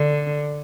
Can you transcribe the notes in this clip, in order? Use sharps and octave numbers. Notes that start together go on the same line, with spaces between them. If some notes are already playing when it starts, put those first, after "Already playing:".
Already playing: D3